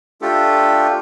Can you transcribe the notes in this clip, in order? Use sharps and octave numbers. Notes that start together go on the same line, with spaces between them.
A3 D4 F4 G4 A4